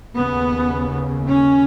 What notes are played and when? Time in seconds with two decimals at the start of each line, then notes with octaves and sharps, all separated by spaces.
0.17 D#2 C#3 B3
1.28 C#4